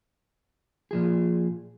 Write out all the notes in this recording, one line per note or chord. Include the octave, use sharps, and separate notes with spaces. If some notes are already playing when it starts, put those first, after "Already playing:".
A#2 F3 G#4